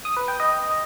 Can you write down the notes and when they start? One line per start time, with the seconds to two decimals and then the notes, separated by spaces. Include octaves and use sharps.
0.05 D#6
0.17 B4
0.28 G5
0.40 D#5